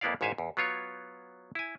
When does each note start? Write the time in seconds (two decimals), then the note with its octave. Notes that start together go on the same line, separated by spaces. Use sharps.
0.01 F2 A#3 B3 E4 D5 F5
0.21 A1 G#2 C#5 E5 F5 G#5
0.38 E2
0.57 F#3 B3 F4 C#5
1.55 E4 G#5